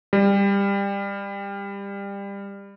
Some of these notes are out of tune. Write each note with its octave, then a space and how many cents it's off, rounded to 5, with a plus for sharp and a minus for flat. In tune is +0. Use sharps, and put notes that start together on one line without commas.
G3 +25